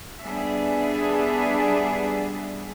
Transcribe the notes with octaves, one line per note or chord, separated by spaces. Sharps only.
G3 B3 D4 G#4 E5